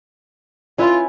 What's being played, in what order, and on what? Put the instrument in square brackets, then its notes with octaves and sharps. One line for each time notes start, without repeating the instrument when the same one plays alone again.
[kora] C#4 E4 B4 [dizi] F4